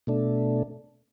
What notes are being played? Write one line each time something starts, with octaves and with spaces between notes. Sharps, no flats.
B2 A3 D4